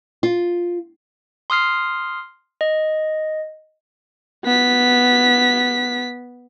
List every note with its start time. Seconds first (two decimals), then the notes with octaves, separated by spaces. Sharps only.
0.23 F4
1.50 C6 D#6 F6 C7
2.61 D#5
4.44 B3 B6